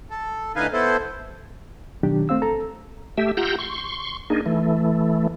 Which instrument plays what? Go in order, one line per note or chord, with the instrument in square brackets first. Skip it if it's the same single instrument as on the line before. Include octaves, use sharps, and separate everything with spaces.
[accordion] A4
A2 D3 D#4 B4 F5 G#5
B3 E4 A4 C5
[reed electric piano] B2 D#3 F#3 D4 G4
A3 C4 C5 F5 E6
A4 A#5
[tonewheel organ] A3 G4 E5
F4 G4 F#5 A#5 E6 G6
C6 C#6
A#3 D4 D#4 G#4
E3 A3